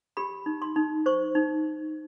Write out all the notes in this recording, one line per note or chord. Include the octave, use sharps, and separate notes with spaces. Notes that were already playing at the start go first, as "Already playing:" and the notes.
G4 B5
D#4
C6
D#4
C5 C#6
D#4